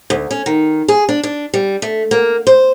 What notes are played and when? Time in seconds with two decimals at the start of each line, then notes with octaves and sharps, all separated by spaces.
0.10 D2
0.31 C#4
0.46 D#3
0.88 G#4
1.09 D4
1.23 D4
1.54 G3
1.82 A3
2.11 A#3
2.47 C5